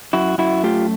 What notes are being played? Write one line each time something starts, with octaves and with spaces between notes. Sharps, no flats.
F#2 E4 F#4
F#2 E4 F#4
A3 F4 G4